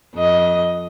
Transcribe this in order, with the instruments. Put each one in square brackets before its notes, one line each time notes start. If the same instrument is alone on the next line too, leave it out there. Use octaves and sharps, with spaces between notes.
[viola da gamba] F2 D#5